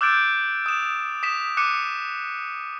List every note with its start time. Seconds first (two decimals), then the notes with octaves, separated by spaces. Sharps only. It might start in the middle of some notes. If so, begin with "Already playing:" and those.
0.01 D6 E6 F#6 G6 A6 D7
0.66 D#6 E7
1.23 D#6 B6 E7
1.57 D6 F#6 C#7 D#7